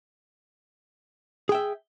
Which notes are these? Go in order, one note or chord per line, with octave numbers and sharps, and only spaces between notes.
G#4 E5 G5